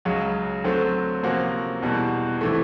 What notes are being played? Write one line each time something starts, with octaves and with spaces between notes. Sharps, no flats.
C#2 C#3 F#3
D3 F#3 A3 C4
C3 F3 A#3 C#4 F#4
E2 B2 G3
C3 E3 A3